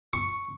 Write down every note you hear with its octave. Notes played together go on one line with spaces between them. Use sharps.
C#6